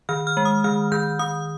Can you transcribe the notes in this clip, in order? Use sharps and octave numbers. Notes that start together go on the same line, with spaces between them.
D#3 F6
F6
G#3
D#6
D#3 F6
D#3 G6
D#3 D#6